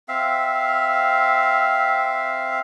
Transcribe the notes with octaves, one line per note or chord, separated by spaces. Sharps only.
C4 E5 F5